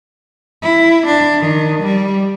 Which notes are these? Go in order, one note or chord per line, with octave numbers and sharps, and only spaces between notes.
E4
D4
D#3
G3